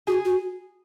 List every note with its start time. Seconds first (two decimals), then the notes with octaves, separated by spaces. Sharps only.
0.07 F#4 G#4
0.25 F#4